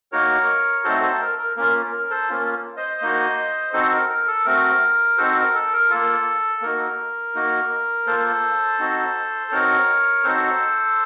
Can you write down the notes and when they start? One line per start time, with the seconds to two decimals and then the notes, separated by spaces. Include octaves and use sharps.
0.12 A#3 D#4 F#4 A#4 C#5
0.84 A3 C4 D#4 F#4 A4 C5
1.02 A4 C5
1.21 A#4
1.38 A#4
1.56 A#3 C#4 F4 A#4
1.92 A#4
2.10 A4 C5
2.29 A#3 C#4 F4
2.77 C5 D#5
3.01 A#3 D#4 F#4
3.73 C4 D#4 F#4 A4 C5
3.92 A#4
4.09 A#4
4.27 A4
4.45 A3 C4 F#4 A#4
5.18 C4 D#4 F#4 A4 C5
5.36 A#4
5.54 A4
5.73 A#4
5.90 A#3 F4 A4
6.62 A#3 D#4 F#4 A#4
7.35 A#3 D#4 F#4
8.07 A#3 F4 A4 C5
8.79 C4 D#4 F#4
9.51 C4 D#4 F#4 A#4 C#5
10.24 C4 D#4 F#4 A4 C5